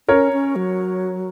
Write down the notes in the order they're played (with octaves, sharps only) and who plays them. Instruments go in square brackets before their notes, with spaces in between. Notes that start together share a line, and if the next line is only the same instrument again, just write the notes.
[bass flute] C#4 [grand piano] A#4 C#5
[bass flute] C#4
F#3